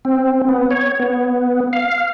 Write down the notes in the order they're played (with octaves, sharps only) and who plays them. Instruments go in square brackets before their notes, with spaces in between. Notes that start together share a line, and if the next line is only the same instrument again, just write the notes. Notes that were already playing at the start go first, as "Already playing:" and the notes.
[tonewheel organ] C4
B3
C#5
B3
F5